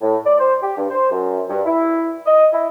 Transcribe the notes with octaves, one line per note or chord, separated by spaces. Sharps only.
A2
D5
C5
G4
G2
C5
F#2
G2
E4
D#5
E4